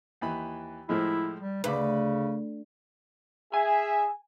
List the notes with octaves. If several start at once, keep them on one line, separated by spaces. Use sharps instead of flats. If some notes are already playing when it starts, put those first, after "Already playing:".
D#2 E3 B5
A2 F3 G#3 E4
G3
D2 C#3 B4 B5 D6
G#4 E5 G#5